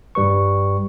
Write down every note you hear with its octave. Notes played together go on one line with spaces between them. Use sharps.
G2 G3 B4 C#6